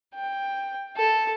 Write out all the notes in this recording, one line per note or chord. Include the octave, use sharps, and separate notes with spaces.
G5
A4